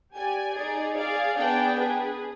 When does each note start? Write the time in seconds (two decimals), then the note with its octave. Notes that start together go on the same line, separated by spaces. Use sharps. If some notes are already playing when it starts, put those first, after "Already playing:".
0.15 G4 D5 G#5
0.56 D#4 G#4 D5
0.97 G#4 D5 F5
1.38 B3 D4 G#4 D5 G5
1.78 D4 G#4 B4